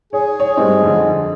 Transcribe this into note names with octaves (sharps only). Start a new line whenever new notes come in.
G#4 C#5
C#5
G2 G3 G#3 C4
F2 D3